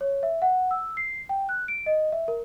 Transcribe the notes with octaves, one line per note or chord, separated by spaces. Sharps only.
C#5
E5
F#5
E6
C7
G5
F#6
D7
D#5
E5
A#4